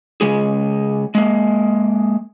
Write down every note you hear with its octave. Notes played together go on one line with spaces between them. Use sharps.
C#3 G#3 G#4
G#3 A#3